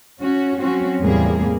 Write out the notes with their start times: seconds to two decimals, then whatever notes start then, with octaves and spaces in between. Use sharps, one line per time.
0.19 C#4 F#4
0.59 F#3 C4 C#4 F#4
1.00 E2 A2 C3 G3 A#3 G#4